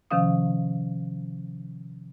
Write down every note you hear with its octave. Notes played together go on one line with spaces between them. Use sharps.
C3 D#3 F3 C#4 F5 D#6